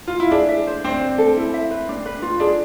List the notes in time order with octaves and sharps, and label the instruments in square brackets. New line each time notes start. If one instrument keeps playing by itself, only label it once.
[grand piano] F4
E4
[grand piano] D4 [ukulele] G#4
[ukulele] E5
C5
[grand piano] C4 [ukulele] D4
[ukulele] C5
A4
E4
E5
B4
D4
B4
F4
[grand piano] D4 [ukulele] G#4